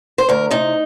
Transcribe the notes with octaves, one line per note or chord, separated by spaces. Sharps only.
C5
D2 A#4
C3 D#4